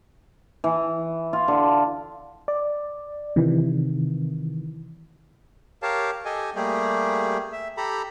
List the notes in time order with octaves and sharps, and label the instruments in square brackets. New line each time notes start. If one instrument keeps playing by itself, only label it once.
[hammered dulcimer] E3
F4
D3
[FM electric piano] D5
C3 D#3 E3
[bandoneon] G4 A#4 C#5 F5 A5
G4 A4 D#5 G#5
G3 A3 A#3 G4 G#4
E5
G4 A4 A#5 B5